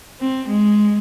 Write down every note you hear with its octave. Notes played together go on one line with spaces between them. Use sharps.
C4
G#3